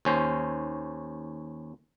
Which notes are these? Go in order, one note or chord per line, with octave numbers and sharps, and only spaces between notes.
D#2 C#4 C5